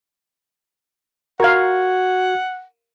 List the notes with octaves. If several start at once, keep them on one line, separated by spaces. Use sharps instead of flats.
F#4 A#4 F5 F#5 G#6